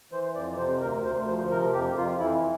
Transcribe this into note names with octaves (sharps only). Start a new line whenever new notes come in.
E3 C5
F2 D5
C3 C5
D2 A#4
D2 C5
F3 C5
C3 A#4
F2 G4
F2 F4
E3 E4